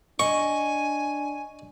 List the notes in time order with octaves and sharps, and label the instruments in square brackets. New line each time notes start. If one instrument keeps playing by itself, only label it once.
[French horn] D4 [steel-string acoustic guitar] D#5 [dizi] G#5 [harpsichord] C#6